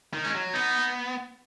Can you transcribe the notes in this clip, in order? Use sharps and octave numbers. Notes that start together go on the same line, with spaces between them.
D#3
G#3 C#4
F#3
B3 D#4